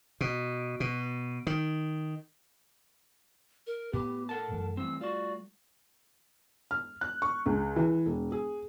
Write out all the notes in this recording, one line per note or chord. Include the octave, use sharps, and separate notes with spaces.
B2
B2
D#3
A#4
A2 B3 G4
A4 A#4 F#5 A5
F#2 E3 A3
E3 G3 A3 C4 E6
F4 F#4 D5
F6
F#6
C#6
C#2
E3
E1
G#4